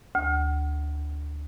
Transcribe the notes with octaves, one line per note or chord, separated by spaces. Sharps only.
D2